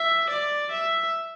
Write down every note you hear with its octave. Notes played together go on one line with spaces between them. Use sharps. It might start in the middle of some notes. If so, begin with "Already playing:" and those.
Already playing: E5
D5
E5